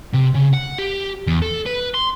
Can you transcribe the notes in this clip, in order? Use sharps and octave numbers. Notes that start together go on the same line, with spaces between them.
C3
C#3
F#5
G4
E2
A4
B4
C6